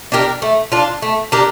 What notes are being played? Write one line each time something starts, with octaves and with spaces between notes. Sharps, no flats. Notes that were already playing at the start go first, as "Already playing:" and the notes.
D4 G4 A#4
A3
D4 F4
A3
D4 G4 A#4